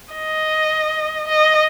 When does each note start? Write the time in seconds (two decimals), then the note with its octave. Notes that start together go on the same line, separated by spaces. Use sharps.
0.14 D#5
1.28 D#5